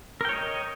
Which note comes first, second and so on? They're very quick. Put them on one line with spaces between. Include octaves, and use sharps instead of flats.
A#4 G5 C#5 D#5